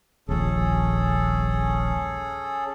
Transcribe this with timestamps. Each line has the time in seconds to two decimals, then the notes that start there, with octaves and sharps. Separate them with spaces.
0.29 D#1 A#1 C#4 G#4 A4